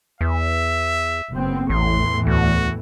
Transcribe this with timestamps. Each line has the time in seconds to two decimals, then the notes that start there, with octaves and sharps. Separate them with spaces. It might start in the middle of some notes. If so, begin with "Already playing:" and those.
0.21 E2 E5
1.31 F#1 B3 C4
1.70 A1 E2 A2 E3 C6
2.27 D2 F#4